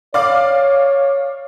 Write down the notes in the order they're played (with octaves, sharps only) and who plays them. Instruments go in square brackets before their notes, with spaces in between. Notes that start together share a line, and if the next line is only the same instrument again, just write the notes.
[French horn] C#5 [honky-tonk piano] D5 F5 D6